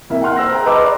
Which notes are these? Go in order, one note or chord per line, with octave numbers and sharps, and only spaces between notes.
C2 A#3 E5
F#5 G5 C6 F6 F#6
C5 E6 A#6
G#4 G5 A#5
B4 D#5 A5 C6 D6 E6
D5